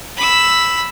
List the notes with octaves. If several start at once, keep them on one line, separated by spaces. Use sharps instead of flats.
B5 E6